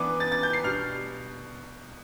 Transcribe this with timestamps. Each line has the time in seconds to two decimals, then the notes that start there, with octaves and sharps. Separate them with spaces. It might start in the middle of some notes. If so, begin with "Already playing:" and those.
Already playing: E3 B3 D4 D6
0.20 A6
0.32 A6
0.43 G6
0.53 C7
0.64 B2 G3 D4 F6